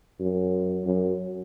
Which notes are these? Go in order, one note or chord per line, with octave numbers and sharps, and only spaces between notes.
F#2
F#2